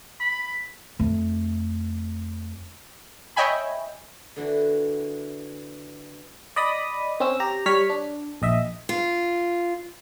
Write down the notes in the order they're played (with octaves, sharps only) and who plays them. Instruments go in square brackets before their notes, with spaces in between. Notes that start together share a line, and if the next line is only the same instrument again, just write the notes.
[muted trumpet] B5
[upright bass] F2 A3
[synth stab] C#5 D#5 E5 G5 G#5 B5
[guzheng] D3 E3 F#4
[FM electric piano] D5 D#5 B5 D#6
C4 C#4 E6
G4 A#5
G3 C#5 F6 B6
D4
A#1 D#5 E5
[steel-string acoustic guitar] F4